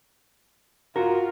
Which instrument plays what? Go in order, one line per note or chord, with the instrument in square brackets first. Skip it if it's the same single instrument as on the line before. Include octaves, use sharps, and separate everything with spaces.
[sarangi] F4 [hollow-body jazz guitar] F#4 A#4